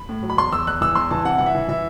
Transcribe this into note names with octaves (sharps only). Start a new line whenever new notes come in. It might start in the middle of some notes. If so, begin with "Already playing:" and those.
Already playing: B5
A2
F#3
B5
E2 C6
E2 E6
E2 F#6
E3 E6
E2 C6
E3 A5
C3 F#5
E3 F#5
E5
E3
E3 E5